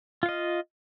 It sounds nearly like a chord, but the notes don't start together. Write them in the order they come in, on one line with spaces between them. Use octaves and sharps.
F4 F5 D#5